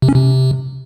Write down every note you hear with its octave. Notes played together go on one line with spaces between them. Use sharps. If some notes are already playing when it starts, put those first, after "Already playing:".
C3
C#4
C3